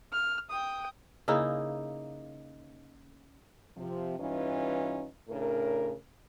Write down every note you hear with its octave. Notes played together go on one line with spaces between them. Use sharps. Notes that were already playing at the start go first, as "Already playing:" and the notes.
F6
G5 D#6
C#3 A#3 D#4 E4
C3 F3
G2 E3 C#4 D#4 F4 B4
A2 C#3 D4 A#4